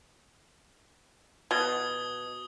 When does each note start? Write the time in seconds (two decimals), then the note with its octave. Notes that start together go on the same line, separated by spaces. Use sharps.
1.51 B2 D#6 G#6 G7